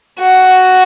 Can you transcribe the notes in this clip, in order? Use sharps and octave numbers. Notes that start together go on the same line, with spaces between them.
F#4